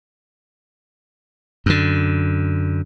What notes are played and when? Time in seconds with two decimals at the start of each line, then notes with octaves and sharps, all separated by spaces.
1.66 F#2 D3